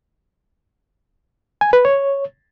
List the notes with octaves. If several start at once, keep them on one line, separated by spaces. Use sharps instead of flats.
G#5
B4
C#5